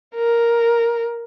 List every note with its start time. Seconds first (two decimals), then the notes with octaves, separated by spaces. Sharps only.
0.15 A#4